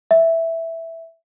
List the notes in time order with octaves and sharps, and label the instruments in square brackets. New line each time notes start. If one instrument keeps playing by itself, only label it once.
[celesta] E5